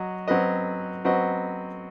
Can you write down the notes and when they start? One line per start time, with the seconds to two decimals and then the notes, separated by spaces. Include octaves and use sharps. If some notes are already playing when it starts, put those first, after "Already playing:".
Already playing: F#3 F#4 D#5
0.28 F#3 C4 F#4 B4 D#5
1.05 F#3 C4 F#4 B4 D#5